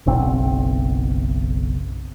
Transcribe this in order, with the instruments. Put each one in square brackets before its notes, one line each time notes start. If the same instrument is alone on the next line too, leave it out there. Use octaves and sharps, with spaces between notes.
[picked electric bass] F#1 B1 C4